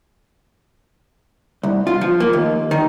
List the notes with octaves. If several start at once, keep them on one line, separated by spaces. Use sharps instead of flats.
C2
F4
F3
A#3
D#2
D#3